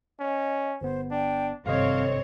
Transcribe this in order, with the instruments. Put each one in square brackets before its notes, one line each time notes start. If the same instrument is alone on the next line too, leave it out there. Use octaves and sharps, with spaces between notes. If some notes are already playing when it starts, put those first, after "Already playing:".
[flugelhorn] C#4 [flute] D#5
[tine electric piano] G1 B3 [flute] C5
[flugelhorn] D4 [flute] G5
[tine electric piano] G#1 C3 D#5 [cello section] G2 C4 C#5 [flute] A4 [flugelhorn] F5